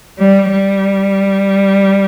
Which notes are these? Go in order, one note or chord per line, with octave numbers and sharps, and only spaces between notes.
G3
G3